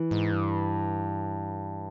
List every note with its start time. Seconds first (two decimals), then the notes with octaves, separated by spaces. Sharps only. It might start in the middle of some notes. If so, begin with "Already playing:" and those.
Already playing: E3
0.11 G#2
0.32 G2